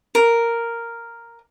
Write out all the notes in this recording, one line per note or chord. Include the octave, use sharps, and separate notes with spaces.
A#4